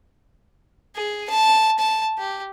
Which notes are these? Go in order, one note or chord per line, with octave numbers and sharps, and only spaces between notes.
G#4
A5
A5
G4